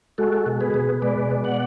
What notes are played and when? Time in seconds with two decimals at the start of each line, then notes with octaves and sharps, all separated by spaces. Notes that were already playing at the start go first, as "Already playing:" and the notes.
0.18 G#3 F#4 A4
0.46 B2
0.61 G#4 B4
0.74 B2
1.02 G#3 B4 D5
1.30 B2
1.44 D5 F#5